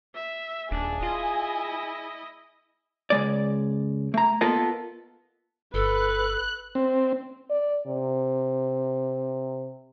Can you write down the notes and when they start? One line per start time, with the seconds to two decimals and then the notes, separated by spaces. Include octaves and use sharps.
0.14 E5
0.71 D#1 D4 G#4 G#5
1.03 E4 F4 D#5
3.10 C#2 G#3 D5
4.14 A3 A#5
4.41 A#3 B3 F4 A4 A#4 D#5
5.74 G1 A4 B4 F#6
6.75 C4
7.51 D5
7.87 C3